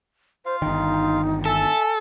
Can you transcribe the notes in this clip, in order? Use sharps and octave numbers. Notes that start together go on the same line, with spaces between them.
F4 C5 F5
G1 D#3 D#4
A4 E5 G#5 A5